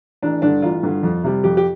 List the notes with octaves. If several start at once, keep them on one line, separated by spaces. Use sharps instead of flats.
A1 D4
G2 D3 D4
A1 F4
G2 D3
F2
C3 G3
F2 G4
G4